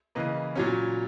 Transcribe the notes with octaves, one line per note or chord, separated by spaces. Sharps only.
C#3 E3 A#3 B4 D#5
A#2 F#3 C#4